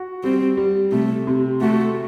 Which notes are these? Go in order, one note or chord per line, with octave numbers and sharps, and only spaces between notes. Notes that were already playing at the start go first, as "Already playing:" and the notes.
Already playing: F#4
G3 C4
G3
C3 A3
C3
A3 F#4